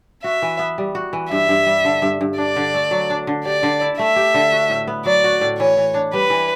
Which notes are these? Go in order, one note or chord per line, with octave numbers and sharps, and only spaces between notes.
F#4 E5
E3
B3
G3
F#4
E3
G2 E5
G2
G3
D3
G2
G2
D4 D5
D3
A3
F#3
D4
D3
G4 D5
D3
E4
A3 E5
G4
D3
F#4
A2
B3
F#3 D5
F#4
A2
E3 C#5
E3
D4
G3 B4
E3